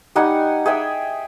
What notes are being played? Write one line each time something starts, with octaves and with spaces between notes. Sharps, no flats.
G3 D#4 F#5 G#5
G#4 E5 G5